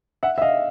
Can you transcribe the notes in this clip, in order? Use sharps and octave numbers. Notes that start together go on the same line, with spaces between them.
E5 F#5
E5
D#5 F5